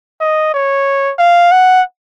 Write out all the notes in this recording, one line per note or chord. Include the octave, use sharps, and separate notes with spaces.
D#5
C#5
F5
F#5